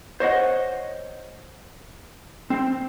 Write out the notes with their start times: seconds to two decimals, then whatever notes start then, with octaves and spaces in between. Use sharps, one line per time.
0.20 C5 C#5 D#5 F#5
2.50 C4